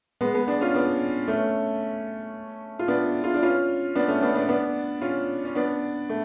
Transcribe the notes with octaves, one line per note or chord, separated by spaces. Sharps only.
G#3 B3
G#3 B3
B3 D4
C#4 F4
B3 D4
A3 C#4
F4
B3 D4
F4
D4
C#4 F4
B3 D4
A3 C#4
B3 D4
B3 D4
B3 D4
C#4 F4
C#4
B3 D4
A3